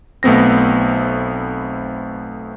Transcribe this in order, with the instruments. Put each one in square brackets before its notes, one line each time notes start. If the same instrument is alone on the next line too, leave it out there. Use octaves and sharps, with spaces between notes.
[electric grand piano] B1 A3 B3 C4 A#6